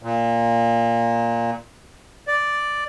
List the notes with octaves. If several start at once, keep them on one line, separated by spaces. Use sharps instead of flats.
A#2
D5